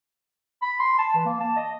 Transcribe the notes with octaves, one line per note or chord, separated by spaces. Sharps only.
B5
C6
A5
E3
A#3
A5
D#5